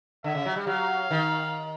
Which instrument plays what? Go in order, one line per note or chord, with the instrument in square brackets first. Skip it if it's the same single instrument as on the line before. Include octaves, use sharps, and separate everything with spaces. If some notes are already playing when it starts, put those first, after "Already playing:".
[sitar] D3 [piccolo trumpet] E5
[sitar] C#3
F#3
G3
[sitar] F#3 [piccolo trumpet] F5
[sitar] D#3